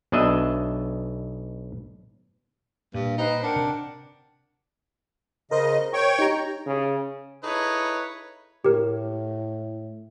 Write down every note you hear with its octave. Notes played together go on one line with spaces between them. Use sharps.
B1 B2 D4 D#5 E5
G2 A#2
D#4 B4 C5 G5
D4 A#4 F#5 G5
C3
C#3 A#4 C5 D#5
C#5 G5 C#6
D#4 G4 A#5
C#3
D#4 E4 G#4 A4 B4 C#5
A2 G4 A#4